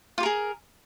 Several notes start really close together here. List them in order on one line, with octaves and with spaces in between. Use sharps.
F4 G4 A#4 G#4